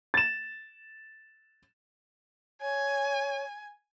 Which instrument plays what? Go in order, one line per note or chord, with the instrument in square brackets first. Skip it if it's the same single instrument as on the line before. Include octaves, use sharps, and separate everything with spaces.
[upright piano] A6 E7
[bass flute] C#5 [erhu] G#5